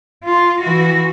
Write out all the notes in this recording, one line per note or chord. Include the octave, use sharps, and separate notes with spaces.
F4
E3 F#4